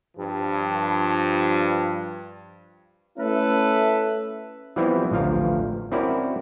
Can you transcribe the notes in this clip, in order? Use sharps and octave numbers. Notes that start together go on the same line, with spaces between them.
G2 F3
A3 C#4 E4 A4 B4
E3 F3 G3 B3 C4 E4
A1 D2 F3 F5 A#5
C4 C#4 E4 F#4 A#4 D5